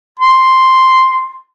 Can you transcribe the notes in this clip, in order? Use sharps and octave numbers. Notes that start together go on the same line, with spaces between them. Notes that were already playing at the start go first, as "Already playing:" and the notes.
C6